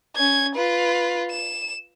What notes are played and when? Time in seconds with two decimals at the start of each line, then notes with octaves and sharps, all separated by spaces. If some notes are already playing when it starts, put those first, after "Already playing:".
0.16 C#4 G#6
0.55 F4 B4
1.30 E7